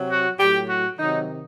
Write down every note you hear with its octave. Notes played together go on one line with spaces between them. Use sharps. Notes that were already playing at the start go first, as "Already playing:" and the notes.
Already playing: C3 F#3
F#4
A2 F#3 G4
F#4
C3 D#3 F#3 D#4